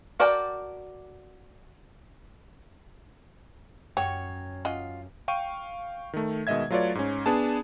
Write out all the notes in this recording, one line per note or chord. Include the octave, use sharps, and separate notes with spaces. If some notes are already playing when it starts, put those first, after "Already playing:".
F#4 A#4 D5 G5 A5
F#2 F#4 C#5 G5
C#4 F4 D#5 F#5
F5 G5 C#6 D#7
D#3 A3
B2 D#3 G#3 D#5 E5 G#6
F#3 A3 F4 B4 C#5 D5
G#2 C#4
B3 D4 G#4 A5